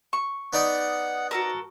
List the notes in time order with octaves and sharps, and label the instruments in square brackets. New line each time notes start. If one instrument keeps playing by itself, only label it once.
[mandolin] C#6
[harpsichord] B3 D#4 D5 [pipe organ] F#5
[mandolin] F#4 A4 A#4